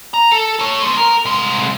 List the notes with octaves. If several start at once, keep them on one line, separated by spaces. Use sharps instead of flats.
A#5
A4
A4 C#5
G#3 B3
A#4
C2 G#3